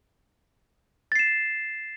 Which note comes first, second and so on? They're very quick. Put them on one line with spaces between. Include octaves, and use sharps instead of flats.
A6 C7 E7